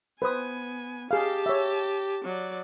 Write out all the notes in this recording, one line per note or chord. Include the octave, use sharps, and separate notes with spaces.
B3 B4 C5 G#5 D#6
G4 G#4 F5 A5
C#5 E5
F#3 D5